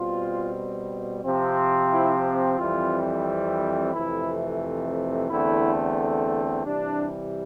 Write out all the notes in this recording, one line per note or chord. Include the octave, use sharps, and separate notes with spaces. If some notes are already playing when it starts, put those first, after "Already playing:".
Already playing: B2 G3 C4 F4
C3 F3 C4
E4
F2 E3 G3 C4 F4
F2 C3 E3 A3 E4
E2 D3 A3 C4 E4
C3 E3 G3 D4